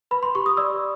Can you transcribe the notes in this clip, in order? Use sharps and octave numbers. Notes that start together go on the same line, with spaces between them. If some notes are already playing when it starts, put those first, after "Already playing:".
B4 B5
C6
G4 C#6
D#6
D5 E6